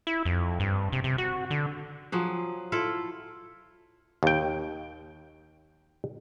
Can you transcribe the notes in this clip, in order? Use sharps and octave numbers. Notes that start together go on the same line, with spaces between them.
E4
F2
G2
C3
C3
F#4
D3
F3 F#3 G#4
E4 F4 A4
D#2 G5